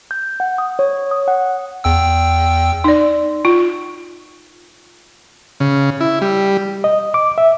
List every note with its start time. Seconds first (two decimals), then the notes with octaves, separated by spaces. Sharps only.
0.11 G6
0.40 F#5
0.58 D#6
0.79 C#5
1.11 D#6
1.28 F#5
1.84 E2 G5 E6
2.84 D#4 D5
3.45 F4
5.60 C#3
6.01 E4
6.21 G3
6.84 D#5
7.14 D6
7.38 E5